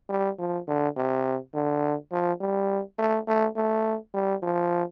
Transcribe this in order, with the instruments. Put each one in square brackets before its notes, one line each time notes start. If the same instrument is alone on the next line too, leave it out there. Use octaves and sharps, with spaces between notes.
[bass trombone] G3
F3
D3
C3
D3
F3
G3
A3
A3
A3
G3
F3